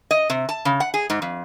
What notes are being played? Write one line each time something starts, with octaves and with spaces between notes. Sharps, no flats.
D#5
C3
A5
C#3
F#5
G#4
G#2
F2